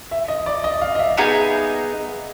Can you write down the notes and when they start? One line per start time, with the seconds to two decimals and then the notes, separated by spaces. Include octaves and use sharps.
0.11 E5
0.28 D#5
0.46 D5
0.64 D#5
0.81 F5
0.95 D#5
0.99 E5
1.17 B3 D#4 G#4